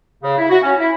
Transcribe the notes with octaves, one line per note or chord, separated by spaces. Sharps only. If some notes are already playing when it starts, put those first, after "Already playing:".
C#3
E4
F#4
C#4
E4